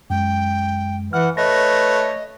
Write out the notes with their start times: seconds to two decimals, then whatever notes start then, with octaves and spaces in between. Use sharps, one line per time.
0.10 F#2 G#3 G5
1.13 E3 F#5 F6
1.37 A3 B4 C#5 D#5 A#6